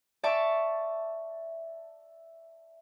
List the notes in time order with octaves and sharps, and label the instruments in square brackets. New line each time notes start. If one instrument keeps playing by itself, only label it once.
[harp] D5 E5 A5 C#6 D6